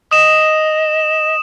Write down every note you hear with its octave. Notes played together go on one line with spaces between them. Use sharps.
D#5 D#6 E7